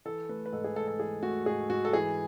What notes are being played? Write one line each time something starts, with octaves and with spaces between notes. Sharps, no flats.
E3 A4
A3 B4
B4
G#2 A4
G#4
G#2 A4
A4
E3 G#4
A3 F#4
G#2 G#4
G#2 F#4
A4
E3 G#4